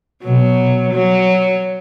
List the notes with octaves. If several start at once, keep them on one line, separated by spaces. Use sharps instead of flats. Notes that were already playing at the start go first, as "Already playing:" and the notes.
B2 F#3
F#3